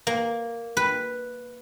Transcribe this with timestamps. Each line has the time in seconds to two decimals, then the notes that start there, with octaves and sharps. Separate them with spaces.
0.07 A#3
0.77 B4